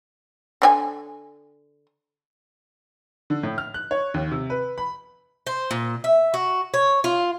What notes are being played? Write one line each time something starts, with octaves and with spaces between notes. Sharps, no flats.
D3 D4 G#5
D3
A2
F6
F#6
C#5
D#2
C3
B4
B5
C5
A#2
E5
F#4
C#5
F4